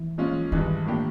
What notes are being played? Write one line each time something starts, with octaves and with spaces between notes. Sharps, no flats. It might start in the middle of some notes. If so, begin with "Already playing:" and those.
Already playing: E3
A#2 F3 G#3 C#4 F4
G2 D#3 E3 G#3
A2 F3 A#3 D4 G4